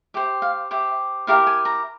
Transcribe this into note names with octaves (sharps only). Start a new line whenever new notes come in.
G4 C5 E5
F5
G4 C5 E5
E4 G4 A#4 F5
G#5
A#5